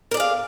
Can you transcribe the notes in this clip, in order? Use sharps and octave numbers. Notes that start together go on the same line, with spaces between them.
G#4 A#4 D5 F5